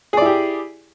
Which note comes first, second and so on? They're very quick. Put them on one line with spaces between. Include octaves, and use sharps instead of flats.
G#4 D5 E4 G4